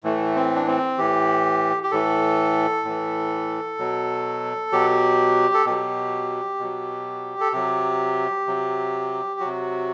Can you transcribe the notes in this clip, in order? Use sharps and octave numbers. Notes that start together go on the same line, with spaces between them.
A2 E3 A3
C4
D4
C4
A2 E3 G4
G4
A2 E3 A4
A2 E3
B2 F#3
B2 F#3 G4
A4
B2 F#3 G4
B2 F#3
A4
C3 F#3 G4
C3 F#3
C3 F#3 F#4